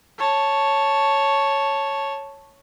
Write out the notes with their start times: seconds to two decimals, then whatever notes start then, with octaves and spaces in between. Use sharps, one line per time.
0.18 C#5 A5